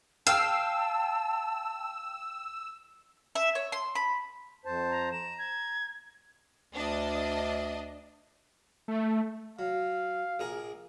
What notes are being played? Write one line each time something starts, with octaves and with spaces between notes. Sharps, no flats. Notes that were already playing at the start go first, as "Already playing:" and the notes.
F5 G5 A5 E6 C7
E5
C#5
C6
B5
F2 C5 A5
A#5
A#5 E7
G#6
D2 D4 D#5
A3
F#3 F5
A#1 G#4 A#4